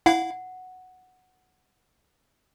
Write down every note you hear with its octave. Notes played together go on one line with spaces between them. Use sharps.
E4 F5 F#5